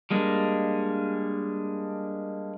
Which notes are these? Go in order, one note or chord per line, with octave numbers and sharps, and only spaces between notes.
G3 G#3 A#3 D4